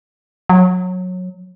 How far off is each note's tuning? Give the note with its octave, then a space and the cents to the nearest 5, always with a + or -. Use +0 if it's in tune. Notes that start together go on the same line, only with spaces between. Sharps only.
F#3 -20